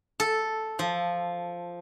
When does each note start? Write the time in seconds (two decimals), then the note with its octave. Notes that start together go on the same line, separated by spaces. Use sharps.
0.20 A4
0.79 F3